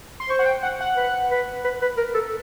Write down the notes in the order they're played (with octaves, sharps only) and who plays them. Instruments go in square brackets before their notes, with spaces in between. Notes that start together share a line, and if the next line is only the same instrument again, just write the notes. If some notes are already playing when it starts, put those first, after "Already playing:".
[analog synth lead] C6
[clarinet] C5 [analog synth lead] C#6
[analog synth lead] F#5
G5
F#5
F#5
[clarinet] B4
B4
B4
B4
A#4
A4